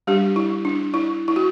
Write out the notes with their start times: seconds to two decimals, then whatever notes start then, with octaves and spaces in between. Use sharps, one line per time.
0.07 G3 D4 G4
0.36 E4
0.65 D4
0.94 E4
1.28 E4
1.36 F#4